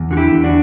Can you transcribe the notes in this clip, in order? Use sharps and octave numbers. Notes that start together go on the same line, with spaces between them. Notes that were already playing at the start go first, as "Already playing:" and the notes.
Already playing: E2
D3 F#4
E4 G4
E2
D4 F#4